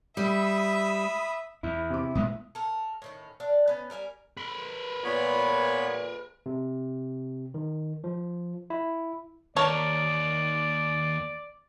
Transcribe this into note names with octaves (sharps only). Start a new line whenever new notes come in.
G3 E5 B5 D#6
E2 E4
C3 C4 D6
A#2 G#3 B3 E5 D#6
A4 A#4
A2 D#3 C#4
D4 F5
B3 C#4
G3 A#4 E5 G#5
A#4 B4
A#2 B3 C#5 B5
C3
D#3
F3
E4
D#2 A#4 C#5 D5 A5